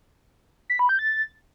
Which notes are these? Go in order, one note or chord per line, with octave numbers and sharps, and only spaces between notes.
B6
B5
G6
A6